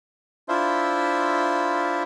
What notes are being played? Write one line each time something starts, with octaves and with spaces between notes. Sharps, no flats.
D4 E4 F4 C5 E5